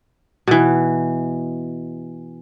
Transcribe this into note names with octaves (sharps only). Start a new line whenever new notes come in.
B2 E3